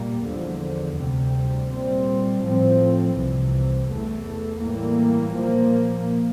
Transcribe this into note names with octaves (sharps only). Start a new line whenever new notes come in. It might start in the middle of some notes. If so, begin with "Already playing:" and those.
Already playing: A#2 G3 A#3
E2 D3 F3
D2 C3 G3
A#2 G3 C4
A2 F3 C4
C2 C3 E3
E2 E3 A3
A2 E3 G3 A#3
A#2 F3 A#3